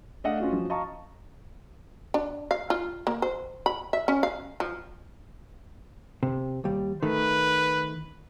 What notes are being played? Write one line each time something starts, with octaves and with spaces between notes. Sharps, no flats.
A3 D4 A4 D#5 F5 F#5
C#4 F4 F#4
F3 F#3 C#4
D#5 F5 A5 A#5 C#6
D4
F5
F4
A#3
C5
B5
E5
C#4
F5
F3
C3
D#2 G3
D#3 A3 B4